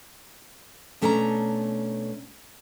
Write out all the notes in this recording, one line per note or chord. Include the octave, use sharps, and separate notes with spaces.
B2 A3 C#4 D4 C#5 A#5